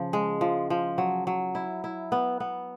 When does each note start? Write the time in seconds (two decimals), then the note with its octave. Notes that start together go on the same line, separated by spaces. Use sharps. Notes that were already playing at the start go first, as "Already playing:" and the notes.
Already playing: C#3 F3
0.13 G#3
0.41 F3
0.70 F3
0.98 F#3
1.27 F#3
1.55 E4
1.84 E4
2.12 B3
2.40 B3